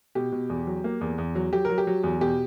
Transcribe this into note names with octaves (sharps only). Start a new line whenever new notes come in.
B2 G4
B2
E2
F#3
A#3
E2
E2
F#3
F#3 G4
F#3 A#4
G4
F#3
E2
B2 G4